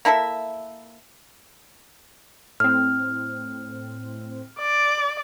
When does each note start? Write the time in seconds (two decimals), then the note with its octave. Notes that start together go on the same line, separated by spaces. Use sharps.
0.05 A#3 E4 A4 E5
2.60 A2 C4 F6
4.60 D5